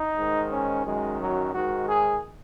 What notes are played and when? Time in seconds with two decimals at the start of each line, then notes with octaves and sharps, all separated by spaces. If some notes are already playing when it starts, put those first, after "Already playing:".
Already playing: D#4
0.17 G#2 D#3
0.51 C#4
0.85 F#2 D#3 G#3
1.20 F#3
1.54 G#2 D#3 F#4
1.88 G#4